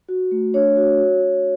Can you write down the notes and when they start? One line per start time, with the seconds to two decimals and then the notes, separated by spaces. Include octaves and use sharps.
0.09 F#4
0.31 A3
0.54 D4 C#5
0.77 F#4
0.99 F#4
1.22 F#4